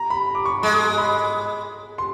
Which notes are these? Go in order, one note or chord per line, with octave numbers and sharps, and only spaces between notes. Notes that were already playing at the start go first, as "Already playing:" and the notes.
Already playing: A#5
B5
D6
C#6
G#3 C6
B5
C6